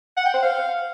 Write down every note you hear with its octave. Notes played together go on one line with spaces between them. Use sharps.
F#5
G5
C5
F5